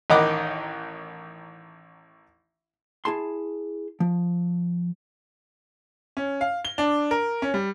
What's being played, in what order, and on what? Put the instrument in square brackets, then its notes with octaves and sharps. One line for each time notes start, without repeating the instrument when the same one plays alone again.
[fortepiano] A1 D#3 D#4 F#5 B5 D6
[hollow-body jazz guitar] E4 G#4 A5 C6
F3
[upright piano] C#4
F5
G7
D4
A#4
C#4
G3